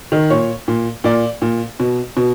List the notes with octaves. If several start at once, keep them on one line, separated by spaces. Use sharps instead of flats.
D#3
A#2 C#5
A#2
A#2 D5
A#2
B2
B2